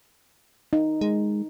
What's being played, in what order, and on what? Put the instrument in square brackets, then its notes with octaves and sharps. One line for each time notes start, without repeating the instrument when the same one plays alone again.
[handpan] D#4
[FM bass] G#3